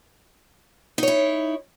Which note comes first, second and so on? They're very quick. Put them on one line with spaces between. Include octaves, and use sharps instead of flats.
D#4 C#5 E4